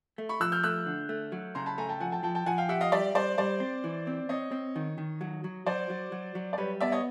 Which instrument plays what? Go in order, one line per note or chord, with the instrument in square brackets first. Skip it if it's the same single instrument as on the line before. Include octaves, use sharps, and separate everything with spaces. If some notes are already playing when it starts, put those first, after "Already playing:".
[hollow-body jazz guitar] A3
[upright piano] B5 C#6
[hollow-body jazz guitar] F3 [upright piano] E6 F#6
[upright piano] F6 G6
[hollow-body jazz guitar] A3 [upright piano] E6 F#6
[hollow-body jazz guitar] D3
A3
F#3
[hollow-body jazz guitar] C#3 [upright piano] A#5 C6
[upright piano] A5 B5
[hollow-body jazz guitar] A3 [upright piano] G#5 A#5
[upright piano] G5 A5
[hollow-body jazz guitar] F3 [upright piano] F#5 G#5
[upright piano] G5 A5
[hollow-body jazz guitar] F3 [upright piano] G5 A5
[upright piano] G5 A5
[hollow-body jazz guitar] F3 [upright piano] F#5 G#5
[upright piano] F5 G5
[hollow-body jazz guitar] G4 [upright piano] E5 F#5
[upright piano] D#5 F5
[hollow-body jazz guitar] G3 [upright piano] D5 E5
[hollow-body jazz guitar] G3 [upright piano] C5 D5
[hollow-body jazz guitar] G3 [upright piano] C5 D5
[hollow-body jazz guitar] C4
E3
C4
[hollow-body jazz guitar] C4 [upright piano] C#5 D#5
[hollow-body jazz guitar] C4
D#3
D#3
F#3
F#3
[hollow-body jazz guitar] F#3 [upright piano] C5 D5
[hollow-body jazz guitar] F#3
F#3
F#3
[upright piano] D5
[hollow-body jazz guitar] G3 [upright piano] B4 C#5
[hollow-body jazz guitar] B3 [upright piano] D5 E5
[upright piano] C#5 D#5